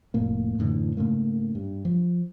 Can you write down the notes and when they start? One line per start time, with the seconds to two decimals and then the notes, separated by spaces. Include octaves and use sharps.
0.14 F1 A2 A#3
0.59 F#2 A2 D3 E3
0.97 G#2 C#3 A3 A#3
1.55 G2
1.85 F3